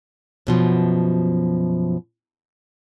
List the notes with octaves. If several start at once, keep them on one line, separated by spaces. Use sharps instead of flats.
F#2 B2 F3